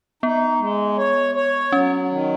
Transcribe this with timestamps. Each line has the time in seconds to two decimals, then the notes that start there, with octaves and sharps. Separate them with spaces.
0.23 B3 D#4
0.60 G#3
0.97 C#5
1.35 C#5
1.72 F#3 C#4
2.10 D#3